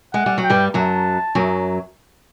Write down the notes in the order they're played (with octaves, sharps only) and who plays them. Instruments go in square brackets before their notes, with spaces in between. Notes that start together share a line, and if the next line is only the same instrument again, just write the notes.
[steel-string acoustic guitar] G#3 [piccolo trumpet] F#5
[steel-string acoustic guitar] G3
F#3
[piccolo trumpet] G5
[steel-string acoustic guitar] G2 G3
[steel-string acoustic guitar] F#2 F#3 [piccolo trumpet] A5
[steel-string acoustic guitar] F#2 F#3